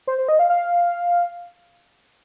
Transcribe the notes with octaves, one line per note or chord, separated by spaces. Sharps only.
C5
C5
D#5
F5
F5